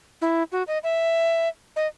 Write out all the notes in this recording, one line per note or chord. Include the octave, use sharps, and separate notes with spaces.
E4
F#4
D#5
E5
D#5